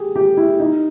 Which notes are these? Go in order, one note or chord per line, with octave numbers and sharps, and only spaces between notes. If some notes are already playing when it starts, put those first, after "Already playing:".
Already playing: G4 G#4
G4
E4
D#4